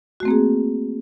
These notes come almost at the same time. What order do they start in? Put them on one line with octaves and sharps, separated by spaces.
F#4 A3 C4 A#3 G#4